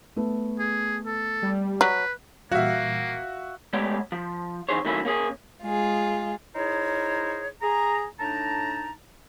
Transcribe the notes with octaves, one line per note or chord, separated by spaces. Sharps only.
A3 B3
G#4
A4
G3
F#3 B4
A#2 E3 G3 A#3 F#4 E5 F5
G#3 A3 B3 G4 C#5 D5
F3
E3 D#4 G#4 C5 C#5
D#3 F#3 A3 A#3 C#4 E4
A#3 C#4 G#4
G#3 F4 G#4
D#4 E4 G#4 A#4 C5 C#5
G#4 A#5
A2 D4 D#4 A5 A#5